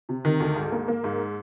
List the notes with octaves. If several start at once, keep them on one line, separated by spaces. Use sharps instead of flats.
C3
D#3
D2
G#2
A#3
A#3
G#2